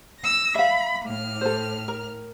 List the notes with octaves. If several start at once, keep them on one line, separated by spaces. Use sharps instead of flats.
E6 A#6
E5 F5 B5
A2 F6
A4 C5
A#4